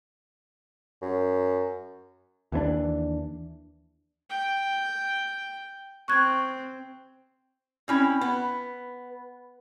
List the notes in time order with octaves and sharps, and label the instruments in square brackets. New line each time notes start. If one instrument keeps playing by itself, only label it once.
[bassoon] F#2
[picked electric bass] D#2 E3 B3 D4
[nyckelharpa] G5
[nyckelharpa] C4 [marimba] C#6 F#6 G#6
[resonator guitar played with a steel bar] C4 C#4 E4
B3